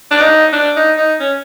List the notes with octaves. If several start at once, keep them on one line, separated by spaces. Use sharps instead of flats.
D4
D#4
D4
D#4
D#4
C#4